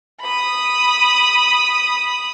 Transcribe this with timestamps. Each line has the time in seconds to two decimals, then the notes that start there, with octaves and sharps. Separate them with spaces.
0.21 B5 D#6